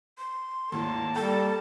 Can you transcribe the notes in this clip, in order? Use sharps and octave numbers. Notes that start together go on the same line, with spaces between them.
C6
G#1 D#2 A2 A#3 A5
G3 A4 G5 A#5 G6